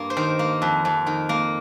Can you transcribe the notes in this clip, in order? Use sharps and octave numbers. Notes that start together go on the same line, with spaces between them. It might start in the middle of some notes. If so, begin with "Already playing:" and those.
Already playing: G2 A#3
C5
D#3 A#4
A#3
F2
F2
D#3
A#3